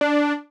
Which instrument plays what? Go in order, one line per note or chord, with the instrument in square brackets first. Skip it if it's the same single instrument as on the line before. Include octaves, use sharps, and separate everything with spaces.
[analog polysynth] D4